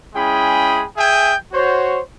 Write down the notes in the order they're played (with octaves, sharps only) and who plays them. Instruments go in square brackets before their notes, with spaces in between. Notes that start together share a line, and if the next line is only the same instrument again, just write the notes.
[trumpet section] G#3 C#4 E4 G#4 G5 B5
G#4 E5 G5 G#5
F#4 C5 C#5